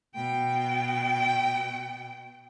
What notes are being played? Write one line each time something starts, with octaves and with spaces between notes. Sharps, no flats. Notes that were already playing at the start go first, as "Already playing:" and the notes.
B2 G5